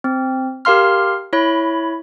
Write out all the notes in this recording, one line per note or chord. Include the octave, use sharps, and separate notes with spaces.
C4
G4 A#4 F5 C6 F6
E4 C#5 B5